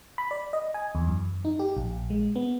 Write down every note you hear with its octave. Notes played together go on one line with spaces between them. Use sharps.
B5
D5
D#5
G#5
E2
F#2
D#4
G4
A#1
G#3
B3